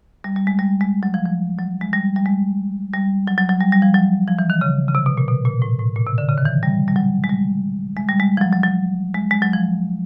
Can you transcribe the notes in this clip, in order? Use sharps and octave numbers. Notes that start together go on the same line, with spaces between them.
G3
G3
G#3
G3
G#3
F#3
F3
F3
F#3
G#3
G3
G3
G#3
G3
F#3
F#3
F#3
G3
G3
F3
F#3
F3
E3
D#3
C#3
C#3
C3
B2
A#2
B2
A#2
A2
A2
A#2
C3
D3
C#3
D#3
E3
G3
G3
F#3
G#3
G3
G#3
G3
G#3
F3
F#3
F#3
F#3
G#3
G#3
F#3
F3